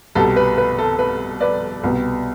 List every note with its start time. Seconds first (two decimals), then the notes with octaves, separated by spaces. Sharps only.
0.15 C2 B2 G3 B3 A4
0.36 B4
0.58 B4
0.78 A4
0.99 B4
1.41 B4 D5
1.83 C2 B2 B3